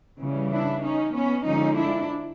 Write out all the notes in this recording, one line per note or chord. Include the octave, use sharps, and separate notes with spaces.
C#3 E3 G3
D4 E4
C#4 D#4
B3 C#4
D3 F3 G#3 C#4 D#4
D4 E4